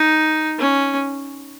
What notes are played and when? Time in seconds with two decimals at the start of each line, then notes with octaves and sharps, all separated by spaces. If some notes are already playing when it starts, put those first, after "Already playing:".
Already playing: D#4
0.59 C#4